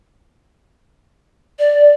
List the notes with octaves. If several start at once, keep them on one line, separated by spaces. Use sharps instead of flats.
D5